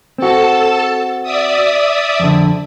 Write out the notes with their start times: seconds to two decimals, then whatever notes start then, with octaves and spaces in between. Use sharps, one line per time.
0.18 C4 F#4 A4 A5
1.23 D5 E5 D#6
2.20 F2 D3